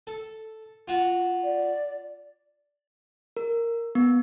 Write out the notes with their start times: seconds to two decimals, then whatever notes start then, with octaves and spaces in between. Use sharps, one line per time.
0.07 A4
0.88 F4 F#4
1.44 D5
3.37 A#4
3.95 B3